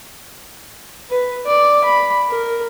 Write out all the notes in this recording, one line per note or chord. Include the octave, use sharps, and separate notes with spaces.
B4
D5
B5
A#4